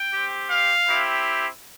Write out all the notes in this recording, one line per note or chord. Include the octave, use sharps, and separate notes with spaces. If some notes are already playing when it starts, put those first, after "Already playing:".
Already playing: G5
C4 G4
F5
C4 E4 G4